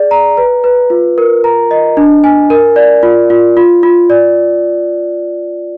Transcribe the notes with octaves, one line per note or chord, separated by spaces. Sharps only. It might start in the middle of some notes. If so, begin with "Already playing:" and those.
Already playing: G#4 D5
A#5
B4
B4
F4
A#4
A#5
D#5
D4
G#5
A#4
D5
F4
F4
F4
F4
D5